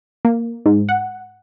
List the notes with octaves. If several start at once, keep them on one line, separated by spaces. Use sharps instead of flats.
A#3
G#2
F#5